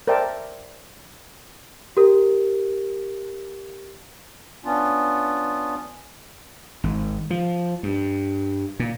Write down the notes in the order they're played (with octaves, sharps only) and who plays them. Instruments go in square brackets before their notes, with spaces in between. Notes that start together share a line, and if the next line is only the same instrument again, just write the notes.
[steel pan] A#4 C5 D5 E5 G5 A5
[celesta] G4 A#4
[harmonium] B3 C#4 D4 F4
[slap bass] G#1
F3
G2
A#2